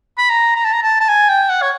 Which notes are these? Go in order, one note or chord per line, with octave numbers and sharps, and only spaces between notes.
B5
A#5
A#5
A5
A#5
A5
A5
G#5
G5
F#5
C#5